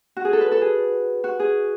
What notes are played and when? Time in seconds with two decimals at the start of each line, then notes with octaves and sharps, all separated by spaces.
0.17 F#4
0.25 G#4
0.33 A4
0.41 B4
0.52 A4
0.61 G#4
1.24 F#4
1.40 G#4